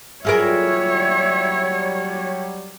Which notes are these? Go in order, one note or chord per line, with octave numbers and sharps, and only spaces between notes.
F#3 G3 F4 G#4 A#4 C#5 E5